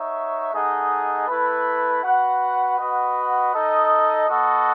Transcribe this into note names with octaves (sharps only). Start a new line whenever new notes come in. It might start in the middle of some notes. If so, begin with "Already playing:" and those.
Already playing: D#4 F#4 C#5 E5
A3 D#4 G#4 D#5 F#5
A3 E4 B4
F#4 B4 F#5
F#4 B4 D#5 F#5
D#4 A4 D#5
B3 F#4 A4 D#5 F#5